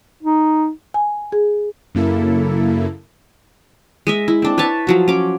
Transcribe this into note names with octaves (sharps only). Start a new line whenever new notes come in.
D#4
G#5
G#4
F#2 C#3 A#3 E4 A4
G#3 D#5 E5
E4
C4 D4
B4 C#5 E5 A5
F3 F#3 F#4
C#4 D6